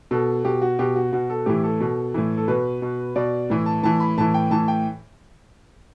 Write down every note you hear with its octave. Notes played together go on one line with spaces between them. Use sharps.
B2 A4
B2 G4
F#4
B2 G4
F#4
B2 F#4
A4
A2 E3 G4
A4
B2
A2 E3
A4
B2 B4
B2
B2 D5
A2 E3
A5
A2 E3 A5
B5
A2 E3 A5
G5
A2 E3 A5
G5